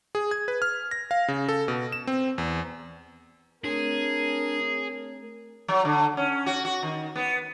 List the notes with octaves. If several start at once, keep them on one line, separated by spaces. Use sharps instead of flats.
G#4
G#6
B4
F6
A#6
F5
C#3
A4
B2
E7
C4
E2
A3 C4 D4 G#4 A#4 C#5
F#3
D3
C#4
F#4
F#4
D#3
B3